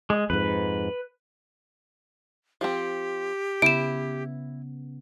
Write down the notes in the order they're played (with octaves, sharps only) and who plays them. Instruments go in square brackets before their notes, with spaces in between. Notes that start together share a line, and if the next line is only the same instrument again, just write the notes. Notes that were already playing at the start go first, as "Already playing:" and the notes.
[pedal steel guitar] G#3
[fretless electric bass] F2 G#2 [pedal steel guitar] B4
[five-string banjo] F3 C4 [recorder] G4
[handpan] C#3 B3 [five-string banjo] E4 [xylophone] D7 E7